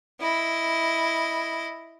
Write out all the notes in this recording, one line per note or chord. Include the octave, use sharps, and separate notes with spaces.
E4 D#5